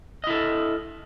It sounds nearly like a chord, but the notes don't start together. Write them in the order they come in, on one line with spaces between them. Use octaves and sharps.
D#5 E4 A4